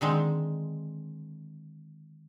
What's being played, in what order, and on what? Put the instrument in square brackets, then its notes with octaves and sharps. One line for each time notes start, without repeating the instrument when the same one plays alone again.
[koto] D3 D#3 G#3 C4